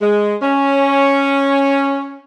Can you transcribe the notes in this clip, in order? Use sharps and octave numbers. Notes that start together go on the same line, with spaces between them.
G#3
C#4